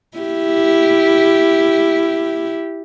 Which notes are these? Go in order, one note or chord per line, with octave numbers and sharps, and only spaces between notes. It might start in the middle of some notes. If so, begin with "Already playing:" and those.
E4 G4